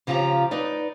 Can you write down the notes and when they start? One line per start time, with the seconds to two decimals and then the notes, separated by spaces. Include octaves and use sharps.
0.07 C#3 F3 F4 G4 F#5 A#5
0.51 D#4 B4 D5